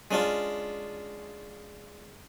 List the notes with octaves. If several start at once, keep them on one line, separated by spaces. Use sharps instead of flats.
G#3 C#4 D4 F4